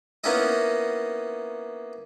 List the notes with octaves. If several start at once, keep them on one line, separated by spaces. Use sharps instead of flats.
A#3 B3 C#4 D#4 E4 D#5